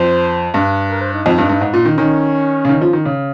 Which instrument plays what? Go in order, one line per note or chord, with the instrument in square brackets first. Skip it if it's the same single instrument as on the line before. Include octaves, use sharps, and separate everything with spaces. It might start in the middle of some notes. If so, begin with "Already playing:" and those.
Already playing: [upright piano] F2 [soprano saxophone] C5
[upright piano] G2
[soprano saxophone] A#4
C5
D#4
[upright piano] F2
G2
G2
G#2
A#2
D#3
[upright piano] D#3 [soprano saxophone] C#4
[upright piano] C#3
D#3
F3
D#3
C#3